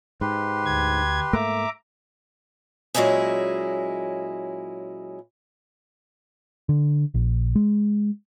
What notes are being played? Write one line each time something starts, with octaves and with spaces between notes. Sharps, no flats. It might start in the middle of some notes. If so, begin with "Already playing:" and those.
G#2 G4 B4 C6
D2 G#6
G#2 A3 A#3 E5 A#5 D6
A#2 F#3 G#3 C#4 E4 G#4
D3
A#1
G#3